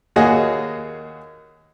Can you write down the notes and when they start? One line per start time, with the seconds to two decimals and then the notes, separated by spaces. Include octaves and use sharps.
0.16 D#2 A#3 F#4 G#4 C#5 D#5